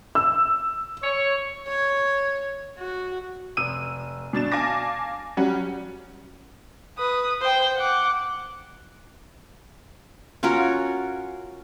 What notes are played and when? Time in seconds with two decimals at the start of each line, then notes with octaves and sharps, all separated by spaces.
0.15 E6
1.03 C#5
1.67 C#5
2.78 F#4
3.57 F1 E6 D#7
4.33 B2 D4 A6 E7
4.52 F5 G#5 A5 D6 A#6
5.37 F#3 G3 C#4 F#5
6.98 B4 D#6
7.41 C5 G5
7.77 F#5 D6
10.43 C#4 F4 F#4 A#4